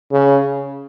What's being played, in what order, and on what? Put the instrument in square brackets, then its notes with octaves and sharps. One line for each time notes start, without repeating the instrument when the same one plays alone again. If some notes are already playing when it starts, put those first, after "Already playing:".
[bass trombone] C#3